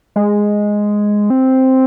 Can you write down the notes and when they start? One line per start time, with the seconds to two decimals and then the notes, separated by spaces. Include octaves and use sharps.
0.16 G#3
1.30 C4